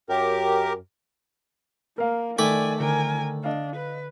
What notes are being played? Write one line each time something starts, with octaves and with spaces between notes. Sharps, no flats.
F#2 G4 A#4
A#3 A#4 F5
D#3 A3 D5 G#5 B5 D6
D3 A#4 C5 G#5 D7
D4 D#5 F5
B4